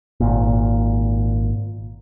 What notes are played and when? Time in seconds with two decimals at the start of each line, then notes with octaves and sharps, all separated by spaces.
0.20 G#1 A#2